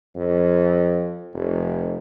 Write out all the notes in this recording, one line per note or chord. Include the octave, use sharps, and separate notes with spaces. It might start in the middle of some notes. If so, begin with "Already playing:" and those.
F2
F1